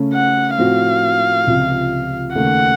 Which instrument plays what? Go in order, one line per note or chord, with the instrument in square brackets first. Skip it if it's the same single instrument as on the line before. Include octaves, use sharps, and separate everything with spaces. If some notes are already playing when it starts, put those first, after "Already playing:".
Already playing: [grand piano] C#3 A3 C#4
[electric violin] F#5
[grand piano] A2 F3 C4 F#4 [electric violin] F5
[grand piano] C#2 C3 F3
[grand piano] D#2 C#3 A3 [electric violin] F#5